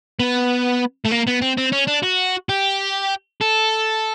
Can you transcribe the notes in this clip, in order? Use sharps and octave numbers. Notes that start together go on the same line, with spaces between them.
B3
A3
A#3
B3
C4
C4
C#4
D4
F#4
G4
A4